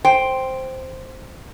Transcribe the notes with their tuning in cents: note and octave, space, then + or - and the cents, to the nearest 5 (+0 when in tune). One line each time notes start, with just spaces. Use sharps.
C5 +0 G5 +0